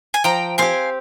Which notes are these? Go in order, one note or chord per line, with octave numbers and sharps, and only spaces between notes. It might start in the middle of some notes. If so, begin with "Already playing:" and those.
G#5
F3 G5 A#5
C4 G4 F5 G#5